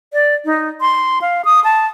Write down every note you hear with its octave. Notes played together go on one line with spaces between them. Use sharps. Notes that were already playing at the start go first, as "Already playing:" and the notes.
D5
D#4
C6
F5
D#6
A5